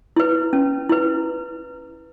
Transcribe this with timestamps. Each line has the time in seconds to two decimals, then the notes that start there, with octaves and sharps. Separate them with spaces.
0.16 E4 B4
0.53 C#4
0.89 E4 B4